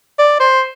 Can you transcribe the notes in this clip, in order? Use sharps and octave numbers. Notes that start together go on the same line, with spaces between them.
D5
C5